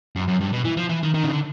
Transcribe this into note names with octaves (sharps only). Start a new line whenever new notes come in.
F#2
F#2
G2
B2
E3
F3
E3
D#3
D#3
C#3
D3